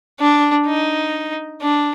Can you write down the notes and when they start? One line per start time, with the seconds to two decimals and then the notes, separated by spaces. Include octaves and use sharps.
0.20 D4
0.67 D#4
1.62 D4